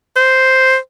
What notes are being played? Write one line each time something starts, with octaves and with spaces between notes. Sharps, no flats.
C5